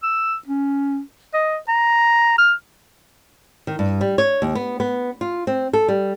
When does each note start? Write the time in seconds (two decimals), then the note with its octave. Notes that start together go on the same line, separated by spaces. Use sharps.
0.03 E6
0.47 C#4
1.34 D#5
1.68 A#5
2.38 F6
3.67 D#3
3.79 G2
4.01 G3
4.18 C#5
4.42 D#2
4.55 B3
4.80 B3
5.21 F4
5.47 C4
5.73 A4
5.88 G3